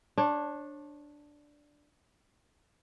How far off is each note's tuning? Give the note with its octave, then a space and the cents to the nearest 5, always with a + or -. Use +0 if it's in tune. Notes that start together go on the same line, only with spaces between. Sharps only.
D4 +0 C#5 -30